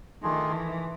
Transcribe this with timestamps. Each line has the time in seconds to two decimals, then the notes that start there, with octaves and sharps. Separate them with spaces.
0.23 D#3 A3 D4 F4 G#4
0.51 E3